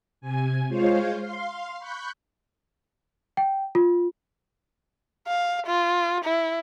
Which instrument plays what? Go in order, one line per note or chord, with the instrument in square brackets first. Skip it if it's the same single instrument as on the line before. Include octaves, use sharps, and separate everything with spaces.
[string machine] C3 G#5
G#3 F4 C5 C#5 F5
F5 C6
B5 C#6 F#6 G6
[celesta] G5
F4
[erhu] F5
F4
E4